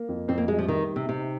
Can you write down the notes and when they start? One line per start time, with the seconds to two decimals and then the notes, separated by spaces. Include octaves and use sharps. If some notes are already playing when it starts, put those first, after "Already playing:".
Already playing: A#3
0.09 F2
0.28 F2 C4
0.38 A#3
0.48 G3 G#3
0.58 F3
0.68 D#3 D#4
0.89 G4
0.96 C3
1.09 C3 D#4